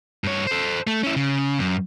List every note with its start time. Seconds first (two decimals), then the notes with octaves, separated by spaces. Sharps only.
0.24 G2 C#5
0.47 A4 C5
0.87 A3
1.03 C#4 E4
1.16 C#3
1.59 F#2